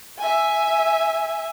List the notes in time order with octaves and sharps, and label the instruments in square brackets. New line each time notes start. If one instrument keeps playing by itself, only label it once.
[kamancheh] E5 G#5